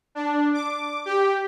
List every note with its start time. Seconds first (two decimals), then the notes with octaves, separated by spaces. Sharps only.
0.15 D4
0.54 D6
1.06 G4